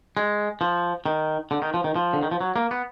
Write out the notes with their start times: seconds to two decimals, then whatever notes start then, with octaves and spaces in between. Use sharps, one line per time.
0.17 G#3
0.61 F3
1.06 D#3
1.51 D3
1.62 D#3
1.74 F3
1.84 D#3
1.96 F3
2.13 D3
2.23 D#3
2.31 F3
2.41 F#3
2.56 A#3
2.71 B3